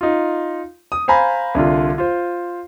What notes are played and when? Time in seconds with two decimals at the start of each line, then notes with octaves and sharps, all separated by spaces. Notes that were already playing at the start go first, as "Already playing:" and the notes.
0.01 D#4 F4
0.92 D#6
1.08 C5 F5 G#5 A#5 B5
1.55 C2 D3 F4
1.98 F4 C5